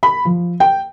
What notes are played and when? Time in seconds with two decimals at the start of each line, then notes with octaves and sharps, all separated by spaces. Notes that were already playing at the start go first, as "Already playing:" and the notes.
0.03 B5
0.25 F3
0.60 G5